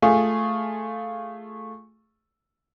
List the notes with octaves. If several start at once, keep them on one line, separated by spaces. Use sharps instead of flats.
A3 F4 G#4